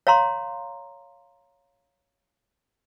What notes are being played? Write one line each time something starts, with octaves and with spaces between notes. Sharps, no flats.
C#5 F5 A#5 C6